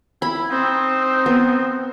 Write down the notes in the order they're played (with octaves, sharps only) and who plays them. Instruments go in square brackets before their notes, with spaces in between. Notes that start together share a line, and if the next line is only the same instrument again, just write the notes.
[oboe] E4 [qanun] B5
[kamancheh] C4 [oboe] D#4
[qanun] B3